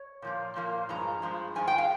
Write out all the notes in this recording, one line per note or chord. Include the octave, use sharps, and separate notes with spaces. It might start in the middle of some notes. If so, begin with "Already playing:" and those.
Already playing: C#5
A#2 F3 A#3
A#2 F3 A#3
G2 F3 G#3 A#5
G2 F3 G#3
G2 F3 G#3 G#5
G5
F5